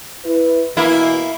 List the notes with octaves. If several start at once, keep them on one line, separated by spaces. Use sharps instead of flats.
E4 B4
B2 E3 A#3 E4